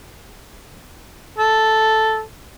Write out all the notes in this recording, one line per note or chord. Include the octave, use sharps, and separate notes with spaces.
A4